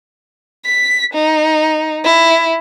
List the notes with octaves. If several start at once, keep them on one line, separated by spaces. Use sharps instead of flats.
B6
D#4
E4